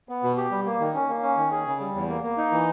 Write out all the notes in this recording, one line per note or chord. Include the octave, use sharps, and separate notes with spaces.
B3
B2
G4
G3
A#3
D#3
C#4
A#3
C#4
D#3
G#4
C#3
G3
E2
A#3
A#3
D#4
E3